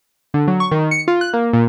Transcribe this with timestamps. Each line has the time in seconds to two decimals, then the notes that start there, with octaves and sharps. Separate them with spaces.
0.34 D3
0.48 F#3
0.60 C#6
0.71 D#3
0.91 C#7
1.08 F4
1.21 F#6
1.33 A#3
1.53 A#2